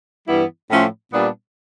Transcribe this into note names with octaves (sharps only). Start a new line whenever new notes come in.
G2 E3 G3 B3 E4
A2 F3 A3 C#4 F4
A#2 G3 B3 D4